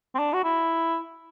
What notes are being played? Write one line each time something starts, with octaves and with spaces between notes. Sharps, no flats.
C4
D4
F#4
E4